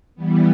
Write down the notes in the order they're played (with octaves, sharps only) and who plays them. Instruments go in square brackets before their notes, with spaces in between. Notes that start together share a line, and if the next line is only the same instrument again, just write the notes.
[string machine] E3 G3 B3